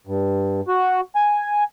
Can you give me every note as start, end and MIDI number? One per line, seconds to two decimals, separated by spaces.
0.07 0.61 43
0.68 1.01 66
1.15 1.63 80